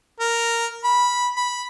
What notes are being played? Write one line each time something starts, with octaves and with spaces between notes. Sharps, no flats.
A#4
B5
B5